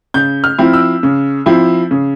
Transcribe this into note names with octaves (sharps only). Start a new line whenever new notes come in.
C#3 G6
F6
F3 C4 E4
E6
C#3
F3 C4 E4
C#3